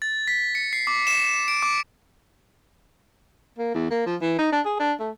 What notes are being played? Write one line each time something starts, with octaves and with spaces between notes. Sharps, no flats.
A6
B6
C#7
C7
D6
E7
D7
D6
A#3
E2
A#3
F3
E3
D#4
D4
G#4
D4
A3